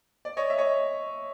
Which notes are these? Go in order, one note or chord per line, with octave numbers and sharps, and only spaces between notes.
D5
C#5 D#5
E5
C#5 D#5